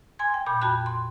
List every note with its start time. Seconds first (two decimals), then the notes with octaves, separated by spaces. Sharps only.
0.19 G#5 C6 G#6
0.34 G5
0.46 A#2 B5 G6
0.61 F2 F#4 G5 B5 F#6
0.86 C6